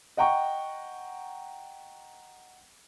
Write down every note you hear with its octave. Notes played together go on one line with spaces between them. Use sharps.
D#5 F#5 G5 A#5 C#6